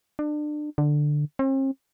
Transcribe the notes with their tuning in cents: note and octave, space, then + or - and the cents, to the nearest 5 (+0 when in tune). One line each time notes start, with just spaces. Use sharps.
D4 +30
D3 +10
C4 +45